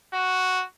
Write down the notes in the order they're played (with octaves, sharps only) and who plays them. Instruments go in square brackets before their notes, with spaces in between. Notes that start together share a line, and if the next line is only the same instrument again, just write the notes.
[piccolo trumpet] F#4